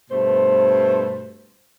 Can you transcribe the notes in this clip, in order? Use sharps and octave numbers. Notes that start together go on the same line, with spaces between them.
G2 B2 A3 C5